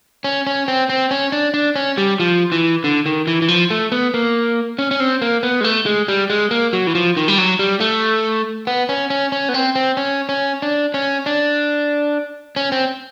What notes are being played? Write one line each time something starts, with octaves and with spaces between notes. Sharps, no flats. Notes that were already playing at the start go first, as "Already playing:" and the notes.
C#4
C#4
C4
C4
C#4
D4
D4
C#4
G3
F3
E3
D3
D#3
E3
E3
F3
A3
B3
A#3
C#4
C#4
C4
A#3
B3
G#3
A3
G#3
G3
G#3
A#3
F#3
E3
F3
D#3
G3
F#3
G3
A3
B3
C#4
C#4
C#4
B3
C4
C4
C#4
C#4
D4
C#4
D4
C#4
C4